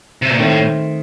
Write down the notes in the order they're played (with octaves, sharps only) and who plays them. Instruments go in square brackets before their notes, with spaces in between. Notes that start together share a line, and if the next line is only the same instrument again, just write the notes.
[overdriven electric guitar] C3
A#2
[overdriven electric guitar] A2 [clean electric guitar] D#3 A3 C4